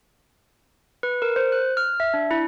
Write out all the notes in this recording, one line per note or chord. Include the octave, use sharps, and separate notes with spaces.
B4
A#4
C5
F#6
F6
E5
D4
E4